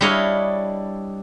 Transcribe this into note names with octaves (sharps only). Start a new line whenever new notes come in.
G3 D4 E4 C#5 D#5 F5